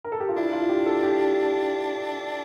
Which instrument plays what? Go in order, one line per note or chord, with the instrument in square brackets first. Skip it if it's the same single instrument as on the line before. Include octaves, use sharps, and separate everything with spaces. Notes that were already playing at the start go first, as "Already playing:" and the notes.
[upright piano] A#4
A4
G4
F4
[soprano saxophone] D4 [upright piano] E4
[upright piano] F4
G4
A4
G4